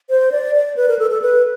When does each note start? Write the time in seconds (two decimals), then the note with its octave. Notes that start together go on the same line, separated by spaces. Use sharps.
0.10 C5
0.32 D5
0.55 D5
0.76 B4
0.89 A#4
0.99 A4
1.10 A4
1.22 B4